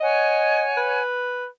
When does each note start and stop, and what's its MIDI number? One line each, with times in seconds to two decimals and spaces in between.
0.01 1.00 73
0.01 0.64 75
0.01 1.00 78
0.01 1.00 80
0.77 1.47 71